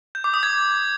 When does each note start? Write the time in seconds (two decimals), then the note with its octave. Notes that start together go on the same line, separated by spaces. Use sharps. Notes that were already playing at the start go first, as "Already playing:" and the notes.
0.15 G6
0.24 D6
0.34 D#6
0.43 G#6